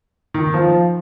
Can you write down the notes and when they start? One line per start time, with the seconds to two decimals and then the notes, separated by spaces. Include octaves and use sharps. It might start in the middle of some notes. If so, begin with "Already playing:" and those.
0.34 D#3
0.54 F3